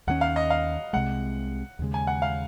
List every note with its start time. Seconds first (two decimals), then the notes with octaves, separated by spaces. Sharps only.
0.07 D#2 D#3 F#3 C#4 F#5
0.21 F5
0.36 D#5
0.50 F5
0.93 C2 C3 F3 G#3 F#5
1.79 D#2 C#3 G#3
1.94 G#5
2.07 F#5
2.22 F5